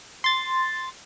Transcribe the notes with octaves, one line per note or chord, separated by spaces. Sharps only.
C6 A6